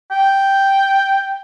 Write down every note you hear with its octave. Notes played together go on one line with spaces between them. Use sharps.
G5